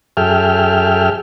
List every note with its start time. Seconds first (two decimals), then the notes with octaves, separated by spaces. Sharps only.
0.17 F#2 G#4 A4 E5 G5 F6